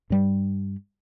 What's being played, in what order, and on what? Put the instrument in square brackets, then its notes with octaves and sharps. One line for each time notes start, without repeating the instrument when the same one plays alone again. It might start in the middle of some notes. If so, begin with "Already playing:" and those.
[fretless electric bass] G2 G3